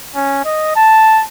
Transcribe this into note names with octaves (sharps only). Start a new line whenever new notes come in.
C#4
D#5
A5